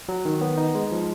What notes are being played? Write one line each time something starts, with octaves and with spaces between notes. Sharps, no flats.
F#3
D#3
B3
D#4
G#3
F3